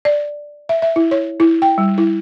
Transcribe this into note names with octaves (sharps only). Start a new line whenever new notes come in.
D5
E5
E5
E4
C#5
E4
G5
G3
E4